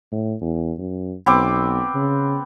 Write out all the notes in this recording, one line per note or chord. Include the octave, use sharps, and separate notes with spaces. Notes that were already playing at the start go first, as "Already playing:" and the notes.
A2
E2
F#2
B1 B3 C4 D6
C#3